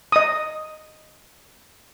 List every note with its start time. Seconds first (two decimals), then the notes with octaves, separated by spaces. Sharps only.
0.12 D#5 D#6